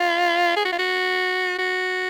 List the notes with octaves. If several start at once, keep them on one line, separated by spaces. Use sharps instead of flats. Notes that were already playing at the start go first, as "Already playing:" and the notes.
Already playing: F4
G#4
F#4
F4
F#4
F#4